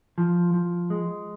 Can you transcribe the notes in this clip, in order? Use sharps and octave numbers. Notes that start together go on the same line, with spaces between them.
F3
F3
G#3